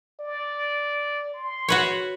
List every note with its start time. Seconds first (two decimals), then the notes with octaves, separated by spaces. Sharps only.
0.20 D5
1.34 C6
1.68 F#4 B4 C#5